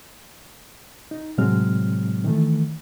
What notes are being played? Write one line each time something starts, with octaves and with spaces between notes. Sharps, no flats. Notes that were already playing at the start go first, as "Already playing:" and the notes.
D#4
A2 C3 F#3 G#3 C4 F6
D#3 E3 A3